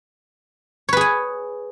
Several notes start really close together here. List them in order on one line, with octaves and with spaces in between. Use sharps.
C#5 B4 G#4 G#5